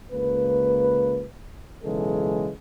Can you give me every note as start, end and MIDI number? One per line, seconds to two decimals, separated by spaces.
0.12 1.25 37
0.12 1.25 58
0.12 1.25 71
1.84 2.50 35
1.84 2.50 49
1.84 2.50 52
1.84 2.50 56
1.84 2.50 69